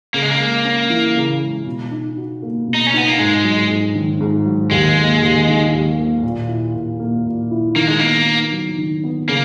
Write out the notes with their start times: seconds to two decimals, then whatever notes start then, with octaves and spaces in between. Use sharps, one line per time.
0.14 C#3 A#3
0.22 G#3
0.31 A#3
0.39 G#3
0.64 C#4
0.90 E3
1.16 C#3
1.41 G#3
1.67 B2
1.92 D#4
2.17 F#4
2.42 A#3
2.68 B2
2.74 D#4
2.87 C#4
2.94 B3 D#4
3.07 A#3
3.18 G#2 G#3
3.44 F#3
3.69 G#2
3.95 D#3
4.20 G#2
4.46 F#3
4.71 D#2 G#3
4.97 A#3
5.22 D#2
5.48 D#3
5.73 D#2
5.98 A#3
6.23 A#2
6.48 E4
6.75 A#2
7.00 A#3
7.25 A#2
7.51 E4
7.76 D#3 A#3
7.87 G#3
7.99 A#3 B3
8.26 D#4
8.52 F#3
8.78 D#3
9.04 B3
9.28 C#3 A#3